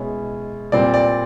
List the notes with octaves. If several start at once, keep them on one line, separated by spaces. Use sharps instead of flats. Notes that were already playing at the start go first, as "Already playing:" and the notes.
Already playing: B2 G#3 C#4 E4
A#2 G3 C4 D5
D5